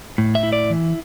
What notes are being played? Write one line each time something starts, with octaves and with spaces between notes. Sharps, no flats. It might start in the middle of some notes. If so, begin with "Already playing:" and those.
A2
E5
E4
D5
E3